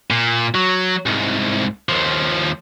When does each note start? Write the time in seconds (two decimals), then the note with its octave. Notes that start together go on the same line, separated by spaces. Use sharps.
0.11 A#2
0.55 F#3
1.06 C2 G#2
1.89 D#2 F3